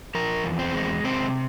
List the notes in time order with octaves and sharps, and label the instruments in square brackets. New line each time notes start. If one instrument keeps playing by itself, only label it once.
[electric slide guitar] F3 A#4
E2
C4
G#3
C3 C4